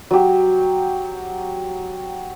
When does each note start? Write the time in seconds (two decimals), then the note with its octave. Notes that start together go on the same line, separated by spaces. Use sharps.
0.11 F#3 G4